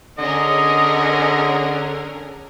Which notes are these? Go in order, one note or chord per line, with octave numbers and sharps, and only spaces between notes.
D3 C#4 G#4 A#4 D#5